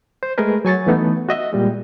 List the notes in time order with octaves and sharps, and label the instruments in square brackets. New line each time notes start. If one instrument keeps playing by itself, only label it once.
[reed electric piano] C5
G#3 A3 G#4 A#4 B4
F#3 G#5 C#6 A6
E3 A3 B3 D#4
F#4 D#5 E5
A#2 G3 G#3